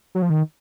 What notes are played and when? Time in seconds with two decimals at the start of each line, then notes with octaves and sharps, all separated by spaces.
0.15 F#3
0.22 F3
0.30 D#3